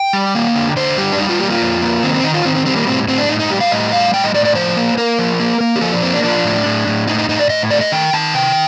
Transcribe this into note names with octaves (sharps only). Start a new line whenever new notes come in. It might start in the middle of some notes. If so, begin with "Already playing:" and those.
Already playing: G5
G3
A#3
D3
D3 C5
G3 G4
D4
G3 D#4
F4
A#3 G4
F4
F2
A#3
D#3 C4
C4
D#3 D#4
F4
D#3 C4
C4
G3 C4
A#3
A2 C4
A2 C4
D4
A2 D#4
D#4
G3 G4
F5
A2 D#5
G3 F5
A2 G5
D#5
A2 D5
D5
F3 C5
A#3
A#3 A#4
F3
A#3
A#3
G4
F3 A4
D4
A#3 C4
D4
F3 D4
A2
A2
A2
A2 D#4
D#4
A2 D#4
D5
A2 D#5
A3 D5
D#5
D#3 G5
D#3 A5
C3 G5